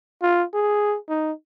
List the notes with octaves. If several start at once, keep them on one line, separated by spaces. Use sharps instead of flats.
F4
G#4
D#4